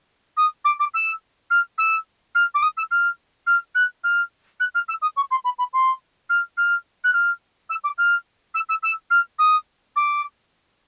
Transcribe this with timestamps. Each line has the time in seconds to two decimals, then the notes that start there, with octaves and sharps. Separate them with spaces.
0.37 D#6
0.65 D6
0.80 D6
0.94 E6
1.50 F6
1.78 E6
2.35 F6
2.54 D6
2.62 D#6
2.77 E6
2.91 F6
3.47 F6
3.75 F#6
4.04 F6
4.60 F#6
4.75 F6
4.88 E6
5.02 D#6
5.16 C#6
5.31 C6
5.44 B5
5.59 B5
5.73 C6
6.30 F6
6.57 F6
7.04 F#6
7.13 F6
7.70 E6
7.84 D6
7.98 F6
8.54 E6
8.69 E6
8.83 E6
9.11 F6
9.39 D#6
9.96 D6